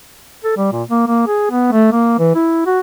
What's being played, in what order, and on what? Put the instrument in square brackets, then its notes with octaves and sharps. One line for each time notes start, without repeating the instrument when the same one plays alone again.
[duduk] A4
G3
A#2
A#3
A#3
G#4
B3
A3
A#3
E3
E4
F#4